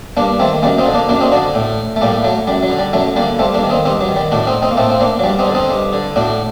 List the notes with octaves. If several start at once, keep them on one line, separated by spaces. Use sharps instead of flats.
G2 A#3 D4
D#3 A3 C4
F#2 G3 A#3
C4 D#4
D3
A#3 D4
F#2 A#3 D4
C4 D#4
D3 D4 F#4
A2
A3
A2 G3 A#3
F#3 A3
F#2 G3
F#3
D3
G3
F#2 F#3 A3
D3 G3 A#3
G2 A3 C4
A#3 D4
D#3
C4 D#4
G2 C4 D#4
F#3
D#3
G3
A2 D4 F#4
C4 D#4
C4 D#4
A#3
A2 A3 C4
C4
A#3 D4
F#3
G2 G3
C4 D#4
D3
C4 D#4
G2
D3
A2 D4 F#4